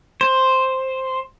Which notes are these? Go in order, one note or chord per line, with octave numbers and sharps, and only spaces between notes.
C5